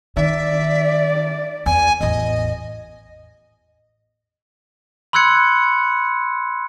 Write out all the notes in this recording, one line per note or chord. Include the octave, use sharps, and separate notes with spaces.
D#3 D5 E5
E2 G#5
A1 E2 D#5
B5 C6 E6 F#6 G#6 C#7